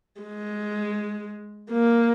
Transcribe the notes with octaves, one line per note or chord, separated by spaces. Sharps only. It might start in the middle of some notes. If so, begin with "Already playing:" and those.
G#3
A#3